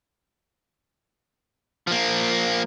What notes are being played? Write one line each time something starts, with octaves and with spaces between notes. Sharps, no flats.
F3 A#3